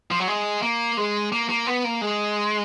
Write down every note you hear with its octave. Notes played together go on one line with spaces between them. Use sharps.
F3
F#3
G#3
A#3
G#3
A#3
A#3
B3
A#3
G#3